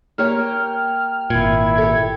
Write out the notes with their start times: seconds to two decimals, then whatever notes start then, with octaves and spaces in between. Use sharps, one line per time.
0.18 A#3 G4 C#5 F6
1.30 G#1 A#2 E4 G#6
1.78 G4 A4